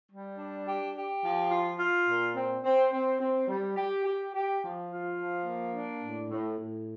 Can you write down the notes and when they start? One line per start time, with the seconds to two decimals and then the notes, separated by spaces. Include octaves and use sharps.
0.10 G3
0.38 D4
0.66 G4
0.95 G4
1.23 F3
1.51 F4
1.79 F4
2.07 A#2
2.36 C4
2.63 C4
2.93 C4
3.20 C4
3.48 G3
3.76 G4
4.05 G4
4.33 G4
4.61 F3
4.90 F4
5.17 F3
5.45 A#3
5.74 D4
6.02 A2
6.30 A2
6.58 A2